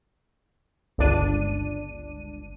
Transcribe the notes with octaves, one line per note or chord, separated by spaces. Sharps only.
G1 C#2 D4 D#7